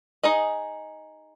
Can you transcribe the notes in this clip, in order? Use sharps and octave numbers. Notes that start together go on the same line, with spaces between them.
D#4 G#4 D#5